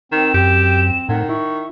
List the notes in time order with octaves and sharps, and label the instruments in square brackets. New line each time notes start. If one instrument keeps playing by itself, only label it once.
[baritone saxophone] D#3 [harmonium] C4 [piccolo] E7
[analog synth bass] F#2 [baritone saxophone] G4
[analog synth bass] A2 [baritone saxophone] D#3 [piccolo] F#5
[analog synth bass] E4 [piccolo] C#6